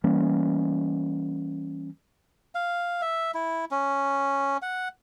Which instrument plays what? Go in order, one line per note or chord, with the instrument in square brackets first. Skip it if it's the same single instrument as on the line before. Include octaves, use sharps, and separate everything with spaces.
[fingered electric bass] E3 G3 A#3 C#4
[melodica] F5
E5
E4
C#4
F#5